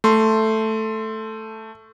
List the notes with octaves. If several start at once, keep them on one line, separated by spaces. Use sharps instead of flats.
A3 C6